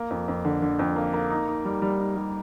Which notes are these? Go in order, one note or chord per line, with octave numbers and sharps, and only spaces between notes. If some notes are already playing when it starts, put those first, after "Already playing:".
Already playing: A#3
F2
F2
D3
D3
F2
A#3
A#3
D#4
D#4
G3
G3
D#4
G3